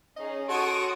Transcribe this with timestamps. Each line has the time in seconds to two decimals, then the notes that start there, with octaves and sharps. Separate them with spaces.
0.17 C#4 D#4 G#4 D#5
0.49 F#4 A4 C#5 C6 C#6 D#6 D7